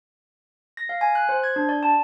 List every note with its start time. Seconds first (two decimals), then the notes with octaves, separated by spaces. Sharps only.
0.77 A#6
0.89 F5
1.01 G#5
1.15 F#6
1.29 C5
1.43 G#6
1.56 D4
1.69 D5
1.83 A5